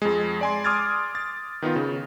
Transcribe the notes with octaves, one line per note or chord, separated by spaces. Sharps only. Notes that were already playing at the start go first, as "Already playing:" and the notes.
F2 G#3
D5 G#5 C6
C6 D6 D#6 F6 G#6 A6
A6
D#3 B3 D#4 F4
C#3